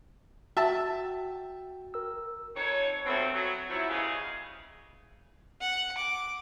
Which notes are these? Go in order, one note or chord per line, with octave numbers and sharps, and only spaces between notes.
F#4 E5 G5 A5
A#4 E6
F2 D#4 A4 C#5
G2 B2 F#3 A3 C4
F#3
F3 F#3 C#4 E4
E2 C#3 G4 G#4 D#5 F5
F#5
D6